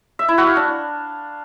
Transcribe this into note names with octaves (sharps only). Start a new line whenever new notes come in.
E5
E4
F#4
F5
D4